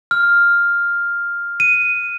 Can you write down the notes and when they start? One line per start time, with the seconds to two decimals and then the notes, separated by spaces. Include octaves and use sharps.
0.11 F6
1.60 D#7